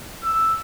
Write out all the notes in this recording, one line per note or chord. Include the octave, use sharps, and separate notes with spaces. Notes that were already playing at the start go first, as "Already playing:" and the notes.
E6